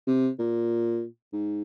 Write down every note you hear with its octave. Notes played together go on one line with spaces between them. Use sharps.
C3
A#2
G#2